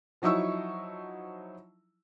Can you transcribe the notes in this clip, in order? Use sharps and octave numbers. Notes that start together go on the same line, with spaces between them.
F3 F#3 D#4 E4 C#6 E6